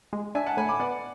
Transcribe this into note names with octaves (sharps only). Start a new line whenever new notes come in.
G#3
D4 E5 G#5
F#5 A5
A2 G#5 B5
B5 D6
B3 D5 F#5